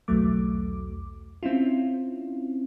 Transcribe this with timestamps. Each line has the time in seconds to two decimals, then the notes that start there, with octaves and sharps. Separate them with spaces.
0.08 B1 E2 F#3 A3 D6
1.43 C4 C#4 E4 F4